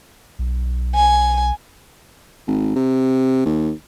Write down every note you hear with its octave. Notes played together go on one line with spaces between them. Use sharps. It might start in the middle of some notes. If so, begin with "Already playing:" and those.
B1
G#5
G#1
C3
D#2